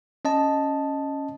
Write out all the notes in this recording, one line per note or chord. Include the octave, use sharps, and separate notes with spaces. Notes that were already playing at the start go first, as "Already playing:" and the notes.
C#4 D#5 A5